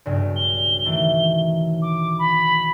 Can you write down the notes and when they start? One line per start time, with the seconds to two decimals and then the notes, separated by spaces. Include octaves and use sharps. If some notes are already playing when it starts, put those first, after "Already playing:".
0.06 B1 G2 C#3
0.36 G7
0.85 D#3 E3 A3
1.82 D6
2.19 B5